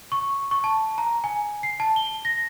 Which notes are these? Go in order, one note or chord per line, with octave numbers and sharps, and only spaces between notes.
C#6
C#6
A5
A#5
G#5
C7
A5
G7
A#6